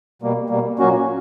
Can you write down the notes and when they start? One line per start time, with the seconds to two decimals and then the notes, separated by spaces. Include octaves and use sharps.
0.22 B2 G3 A#3
0.50 B2 G3 A#3
0.79 A#2 F#3 A#3 C#4 F#4